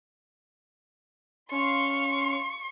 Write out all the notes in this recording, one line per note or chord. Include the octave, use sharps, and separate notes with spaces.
C#4 F5 C6 C#6